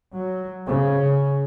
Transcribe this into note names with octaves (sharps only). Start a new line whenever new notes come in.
F#3
C#3